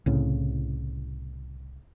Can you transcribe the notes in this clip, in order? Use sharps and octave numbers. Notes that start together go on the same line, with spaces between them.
C2 A2 C#3